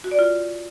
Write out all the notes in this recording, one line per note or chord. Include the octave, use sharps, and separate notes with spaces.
F#4
D5
F4